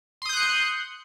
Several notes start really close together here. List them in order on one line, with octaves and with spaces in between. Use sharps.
C6 D#6 G6 F#6 C#7